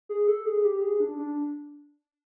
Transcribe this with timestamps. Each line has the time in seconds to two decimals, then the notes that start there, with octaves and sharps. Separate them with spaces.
0.09 G#4
0.28 A4
0.46 G#4
0.64 G4
0.82 G#4
1.00 D4
1.19 D4